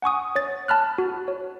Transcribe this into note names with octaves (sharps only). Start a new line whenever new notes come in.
F#5 G#5 C#6 D#6
C#5 A6
A5 B5 F6 F#6
F#4
C#5